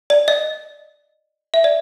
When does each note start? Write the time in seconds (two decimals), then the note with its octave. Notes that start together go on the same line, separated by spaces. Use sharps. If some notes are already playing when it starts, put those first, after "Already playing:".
0.10 D5
0.28 D#5
1.54 E5
1.64 D5